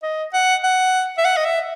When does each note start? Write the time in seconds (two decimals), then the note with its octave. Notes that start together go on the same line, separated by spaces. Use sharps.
0.03 D#5
0.34 F#5
0.64 F#5
1.18 E5
1.25 F#5
1.37 D#5
1.45 E5